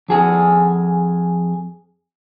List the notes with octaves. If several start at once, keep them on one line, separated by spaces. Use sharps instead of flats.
F2 G#4 G#5